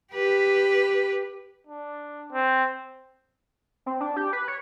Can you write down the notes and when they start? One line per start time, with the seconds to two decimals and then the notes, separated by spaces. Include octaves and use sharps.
0.13 G4 B4
1.67 D4
2.31 C4
3.86 C4
4.01 D4
4.16 G4
4.33 B4
4.48 C#5